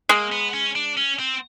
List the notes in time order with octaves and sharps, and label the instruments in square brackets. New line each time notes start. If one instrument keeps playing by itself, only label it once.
[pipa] G#3 [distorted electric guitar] A#3
[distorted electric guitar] B3
C#4
D4
C#4
C4